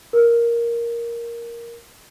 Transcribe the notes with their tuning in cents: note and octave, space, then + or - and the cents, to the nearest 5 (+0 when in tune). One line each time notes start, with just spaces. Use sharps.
A#4 +5